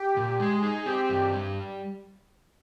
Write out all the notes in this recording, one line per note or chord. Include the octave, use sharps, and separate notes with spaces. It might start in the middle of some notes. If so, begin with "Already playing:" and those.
Already playing: G4
A#2
G#3 G#4
D#4
C4 G4
G2
G3